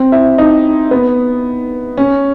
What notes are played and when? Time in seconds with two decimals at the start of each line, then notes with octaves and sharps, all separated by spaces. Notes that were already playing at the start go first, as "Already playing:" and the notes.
Already playing: C4
0.12 E4
0.38 D#4
0.91 B3
1.97 C#4